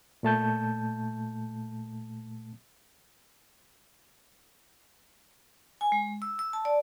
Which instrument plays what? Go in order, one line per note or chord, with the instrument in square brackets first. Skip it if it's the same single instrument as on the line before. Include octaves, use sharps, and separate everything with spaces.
[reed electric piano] A#2 A3 A5 G6
[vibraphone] G#5
G#3
E6
E6
A5
D5